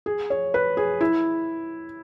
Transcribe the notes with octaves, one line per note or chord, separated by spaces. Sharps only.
G#4
C#5
B4
G#4
E4